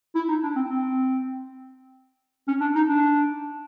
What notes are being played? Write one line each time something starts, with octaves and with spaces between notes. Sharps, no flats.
E4
D#4
D4
C4
C4
C#4
D4
D#4
D4